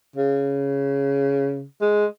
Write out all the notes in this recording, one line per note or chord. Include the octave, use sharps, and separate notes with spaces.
C#3
G#3